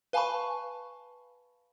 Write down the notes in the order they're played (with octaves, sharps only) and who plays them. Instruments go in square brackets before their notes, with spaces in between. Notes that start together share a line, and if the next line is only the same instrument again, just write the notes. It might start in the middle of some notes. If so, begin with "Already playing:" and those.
[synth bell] B4 F5 G#5 A5 B5 C#6